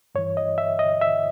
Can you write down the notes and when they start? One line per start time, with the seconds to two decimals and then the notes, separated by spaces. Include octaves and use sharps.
0.15 G2 E3 C#5
0.37 D#5
0.58 E5
0.79 D#5
1.01 E5